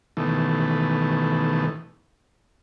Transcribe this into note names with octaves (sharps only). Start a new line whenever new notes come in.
B2 D#3 E3 A3